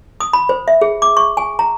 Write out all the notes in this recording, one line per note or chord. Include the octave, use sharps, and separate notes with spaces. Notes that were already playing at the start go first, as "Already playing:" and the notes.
D#6
B5
C5
E5
G#4
D6
C#6
G#5
A#5